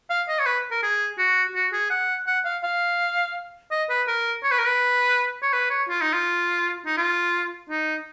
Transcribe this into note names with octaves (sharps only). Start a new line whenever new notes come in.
F5
D#5
C#5
B4
A#4
G#4
F#4
F#4
G#4
F#5
F#5
F5
F5
D#5
B4
A#4
C#5
B4
A#4
B4
C#5
B4
C#5
F4
D#4
F4
D#4
F4
D#4